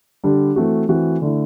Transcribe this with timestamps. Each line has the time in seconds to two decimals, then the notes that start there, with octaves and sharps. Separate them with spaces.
0.24 D3 G3 D4
0.56 E3 A3 C4 F#4
0.89 E3 A3 C4 F#4
1.22 D3 A3 E4